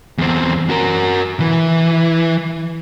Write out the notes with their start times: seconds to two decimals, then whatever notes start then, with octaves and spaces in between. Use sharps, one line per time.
0.18 E2 C4
0.70 F#4 A#4
1.40 E3